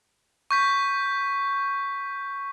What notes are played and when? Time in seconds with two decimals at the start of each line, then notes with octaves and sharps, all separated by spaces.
0.51 C#6 G6 B6